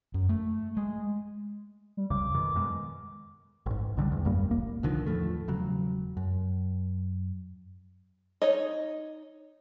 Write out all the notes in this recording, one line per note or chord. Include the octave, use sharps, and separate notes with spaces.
F#2
A3
G#3
G3
C2 F2 C#3 D6
F2 B2 D#3
F#2 B2 G#3
A1 G#2
B1 D3 F#3 G3
E2
A#1 F#2 G3 A#3
D#1 G#1 A#3
C2 D3 D#3 F3
E2 A2 F3 A3
E1 C#3 F#3
F#2
D#4 C#5 D#5